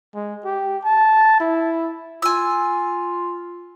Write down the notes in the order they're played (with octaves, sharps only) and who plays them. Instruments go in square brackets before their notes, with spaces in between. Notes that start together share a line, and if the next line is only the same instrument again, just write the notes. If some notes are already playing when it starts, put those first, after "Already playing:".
[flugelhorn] G#3
G4
A5
E4
[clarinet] F4 [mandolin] G#5 E6